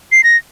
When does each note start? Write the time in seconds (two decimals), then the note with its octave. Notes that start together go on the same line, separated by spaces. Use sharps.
0.12 C7
0.24 A#6